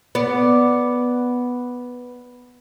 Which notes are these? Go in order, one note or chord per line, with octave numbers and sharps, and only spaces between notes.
B3 D5